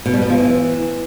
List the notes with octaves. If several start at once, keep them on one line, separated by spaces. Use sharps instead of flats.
B2
G3
B2
F3
E3